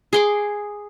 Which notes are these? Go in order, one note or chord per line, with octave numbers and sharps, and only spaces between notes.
G#4 C6 D6